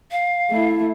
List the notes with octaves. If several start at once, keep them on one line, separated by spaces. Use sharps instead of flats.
F5
A3 E4